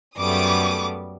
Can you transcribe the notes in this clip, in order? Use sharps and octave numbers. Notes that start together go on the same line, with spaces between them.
F#2 G3 A3 B3 D6 D#6